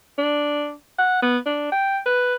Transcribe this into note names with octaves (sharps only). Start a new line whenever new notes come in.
D4
F#5
B3
D4
G5
B4